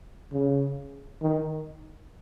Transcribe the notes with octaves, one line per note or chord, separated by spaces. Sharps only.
C#3
D#3